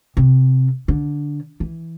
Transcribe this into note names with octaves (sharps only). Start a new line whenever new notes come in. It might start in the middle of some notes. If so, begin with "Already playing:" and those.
C3
D3
E3